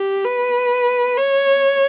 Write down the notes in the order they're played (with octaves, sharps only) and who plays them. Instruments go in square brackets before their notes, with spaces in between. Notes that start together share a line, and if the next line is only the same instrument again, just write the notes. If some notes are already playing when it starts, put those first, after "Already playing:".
Already playing: [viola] G4
B4
C#5